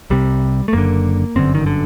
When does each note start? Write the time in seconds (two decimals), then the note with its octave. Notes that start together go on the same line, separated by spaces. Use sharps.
0.10 C2 C3 G3
0.68 A3
0.73 F#1 F#2 D3 A#3
1.36 G1 F#2 D3 C4
1.55 D#3
1.66 D3